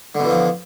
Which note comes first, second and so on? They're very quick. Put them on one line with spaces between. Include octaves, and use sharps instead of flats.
D3 B2 E3 F3